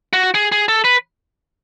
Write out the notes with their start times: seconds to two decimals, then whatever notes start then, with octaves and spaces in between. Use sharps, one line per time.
0.13 F#4
0.34 G#4
0.52 G#4
0.68 A4
0.84 B4